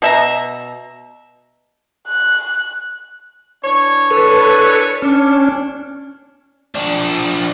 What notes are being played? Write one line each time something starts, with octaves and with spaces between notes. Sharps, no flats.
B2 E5 A#5
F#6
E3 D4 C#5
A4 B4
C#4 D4
F3 D4